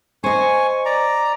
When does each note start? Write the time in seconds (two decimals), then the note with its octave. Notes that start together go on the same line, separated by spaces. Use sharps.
0.24 C5 D#5 G#5 C#6
0.86 D5 A#5